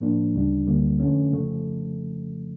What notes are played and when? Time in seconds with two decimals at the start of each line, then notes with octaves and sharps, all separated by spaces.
0.01 A2 F3 A#3 D4
0.34 D2 C#3 G3 D4
0.67 D2 D3 G3 A#3
1.00 F2 D3 A3 C#4
1.33 F2 C#3 F3 A3